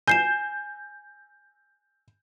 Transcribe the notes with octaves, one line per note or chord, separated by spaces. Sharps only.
G#5 G6 C7 E7